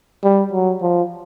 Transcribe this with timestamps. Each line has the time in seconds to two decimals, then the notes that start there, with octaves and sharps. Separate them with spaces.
0.24 G3
0.52 F#3
0.82 F3